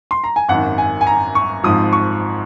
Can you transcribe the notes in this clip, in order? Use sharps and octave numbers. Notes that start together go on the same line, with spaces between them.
C6
A#5
G#5
G#1 F#2 D#3 F#5
G#5
G#5
A#5
C#6
G#1 G#2 F3 D#6
C#6